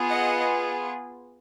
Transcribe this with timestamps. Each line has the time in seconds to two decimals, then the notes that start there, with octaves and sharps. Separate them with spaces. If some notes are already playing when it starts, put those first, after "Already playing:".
Already playing: B3 F4 G#4
0.10 D#5 F#5